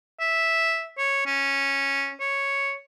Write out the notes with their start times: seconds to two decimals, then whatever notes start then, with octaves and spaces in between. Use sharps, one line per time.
0.20 E5
0.98 C#5
1.26 C#4
2.20 C#5